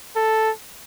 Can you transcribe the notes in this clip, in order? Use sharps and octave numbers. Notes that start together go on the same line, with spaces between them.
A4